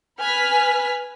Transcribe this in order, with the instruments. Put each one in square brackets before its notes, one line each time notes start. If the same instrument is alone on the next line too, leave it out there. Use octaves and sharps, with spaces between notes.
[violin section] B4 G#5 F6 B6